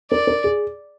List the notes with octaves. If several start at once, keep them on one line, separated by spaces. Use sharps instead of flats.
A#4 D5
A#4
G#4